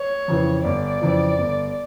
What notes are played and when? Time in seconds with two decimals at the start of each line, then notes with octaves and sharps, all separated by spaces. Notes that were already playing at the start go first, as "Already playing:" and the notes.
Already playing: C#5
0.28 F2 C#3 E3
0.64 G1 D5
1.01 F2 C#3 E3
1.38 G1